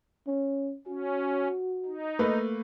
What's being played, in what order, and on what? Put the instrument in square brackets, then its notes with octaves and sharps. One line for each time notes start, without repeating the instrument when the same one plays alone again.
[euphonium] C#4
[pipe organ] C#4 [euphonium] F#4
[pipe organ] D#4
[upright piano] A3 A#3 B4